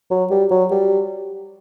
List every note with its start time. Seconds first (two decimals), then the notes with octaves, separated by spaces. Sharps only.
0.11 F#3
0.31 G3
0.51 F#3
0.71 G3